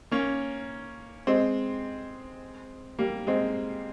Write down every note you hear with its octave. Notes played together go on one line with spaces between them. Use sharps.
A#3 C#4
G#3 C4
G3 A#3
G#3 C4